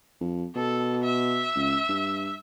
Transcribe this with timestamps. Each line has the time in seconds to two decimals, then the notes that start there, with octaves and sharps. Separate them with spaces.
0.21 F2
0.56 B2 A4
1.03 E5
1.55 C#2
1.89 G2